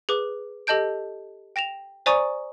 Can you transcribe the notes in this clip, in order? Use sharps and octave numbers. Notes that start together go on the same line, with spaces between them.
G#4 B4 D6
G4 A4 D#5 A5 G6 D7
G5 A#6 E7 F7
C5 D5 G#5 A#5 C#6 D#6